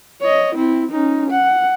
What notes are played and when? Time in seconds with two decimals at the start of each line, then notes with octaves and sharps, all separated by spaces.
0.21 C#5 D#5
0.55 C4 E4
0.91 C#4 D#4
1.31 F#5